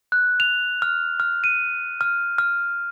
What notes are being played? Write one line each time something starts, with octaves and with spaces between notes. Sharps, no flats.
F#6
F7
F6
F6
D#7
F6
F6